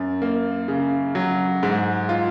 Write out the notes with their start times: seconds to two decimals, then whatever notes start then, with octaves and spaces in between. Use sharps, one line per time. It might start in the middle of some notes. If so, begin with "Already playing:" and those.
Already playing: F#2
0.22 A#3
0.68 C#3
1.15 F#3
1.63 G#2
2.09 F4